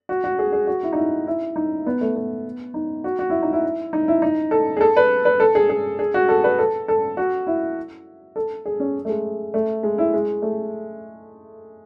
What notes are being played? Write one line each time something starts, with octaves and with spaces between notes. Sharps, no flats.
F#4
F#4
G#4
G#4
F#4
E4
D#4
E4
E4
D#4
B3
A3
B3
D#4
F#4
F#4
E4
D#4
E4
D#4
E4
D#4
A4
G#4
A4
B4
B4
A4
G#4
G#4
G#4
F#4
A4
B4
A4
A4
F#4
E4
A4
G#4
C#4
A3
G#3
A3
G#3
E4
G#3
A3